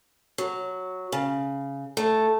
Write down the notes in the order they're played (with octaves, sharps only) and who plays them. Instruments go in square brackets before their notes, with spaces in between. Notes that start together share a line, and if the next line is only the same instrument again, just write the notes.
[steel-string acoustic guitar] F#3
C#3
A3